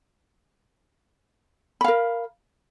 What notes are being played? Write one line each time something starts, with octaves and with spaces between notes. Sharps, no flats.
A#4 F5 B5